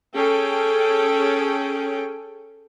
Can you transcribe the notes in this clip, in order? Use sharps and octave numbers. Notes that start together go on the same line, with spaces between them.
C#4 G#4 A4 G5